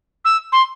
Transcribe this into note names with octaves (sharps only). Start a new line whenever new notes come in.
E6
C6